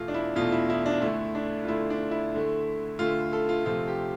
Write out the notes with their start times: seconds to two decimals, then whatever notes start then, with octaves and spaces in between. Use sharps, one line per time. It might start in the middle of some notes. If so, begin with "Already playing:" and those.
Already playing: E2 B2 A3 F4
0.08 D4
0.14 E4
0.36 E2 B2 A3 F4
0.52 E4
0.70 E4
0.86 D4
1.01 D2 D3 A3 E4
1.35 D4
1.64 F4
1.67 D2 D3 A3 E4
1.90 D4
2.11 E4
2.34 D2 D3 A3
2.99 D2 D3 A3 F4
3.33 A4
3.49 F4
3.65 D2 C3 F3 A3 F4
3.88 G4